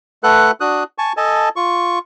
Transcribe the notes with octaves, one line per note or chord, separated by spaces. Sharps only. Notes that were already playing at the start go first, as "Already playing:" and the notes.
A3 A4 B4 F#5 F#6
D4 F#4 D#6 F#6
G#5 A5 C#6
A4 D#5 G#5 A5
F4 C#6